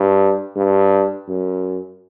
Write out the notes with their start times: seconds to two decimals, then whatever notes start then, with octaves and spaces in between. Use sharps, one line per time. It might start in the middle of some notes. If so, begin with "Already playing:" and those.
Already playing: G2
0.56 G2
1.28 F#2